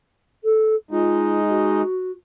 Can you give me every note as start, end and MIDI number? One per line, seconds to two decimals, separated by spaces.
0.43 0.74 69
0.91 1.82 56
0.91 1.82 63
0.91 1.40 65
1.48 2.11 66